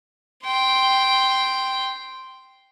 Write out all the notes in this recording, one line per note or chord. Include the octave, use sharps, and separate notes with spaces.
G5 C6